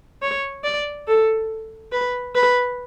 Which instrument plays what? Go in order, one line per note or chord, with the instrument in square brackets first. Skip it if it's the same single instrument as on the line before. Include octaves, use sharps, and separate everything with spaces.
[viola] C#5
D5
A4
B4
B4